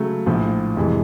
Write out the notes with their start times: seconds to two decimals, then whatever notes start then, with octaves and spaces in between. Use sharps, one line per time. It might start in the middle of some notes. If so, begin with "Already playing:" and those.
Already playing: C#3 F#3 A3
0.26 A#1 A2 F3
0.77 F2 C3 E3 G#3